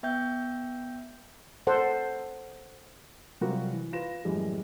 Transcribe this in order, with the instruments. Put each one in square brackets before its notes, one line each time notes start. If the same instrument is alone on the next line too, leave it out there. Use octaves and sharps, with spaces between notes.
[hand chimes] B3 E5 G5 G6
[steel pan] A4 C5 F#5
[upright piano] C3 F#3 G3 F4 F#4 A#4
E3
F4 B4 A#6 E7
F#2 A2 E3 G3 G#3